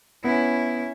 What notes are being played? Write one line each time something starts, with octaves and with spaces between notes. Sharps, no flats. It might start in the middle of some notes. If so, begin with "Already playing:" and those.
B3 C#4 E4